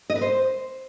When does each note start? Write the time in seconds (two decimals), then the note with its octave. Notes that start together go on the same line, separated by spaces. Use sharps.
0.10 D#5
0.15 B4
0.21 C5